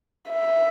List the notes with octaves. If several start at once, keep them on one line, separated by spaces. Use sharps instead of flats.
E5